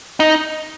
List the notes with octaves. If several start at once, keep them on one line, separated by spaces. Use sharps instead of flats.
D#4